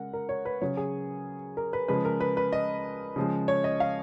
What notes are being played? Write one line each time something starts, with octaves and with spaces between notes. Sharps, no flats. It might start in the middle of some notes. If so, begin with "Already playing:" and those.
Already playing: C#3 G#3 A#4 F#5
A#4
C#5
B4
C#3 F#3 C#5
G#4
A#4
B4
C#3 F3 G#3 B4
A#4
B4
B4
D#5
C#3 F3 G#3
C#5
D#5
F5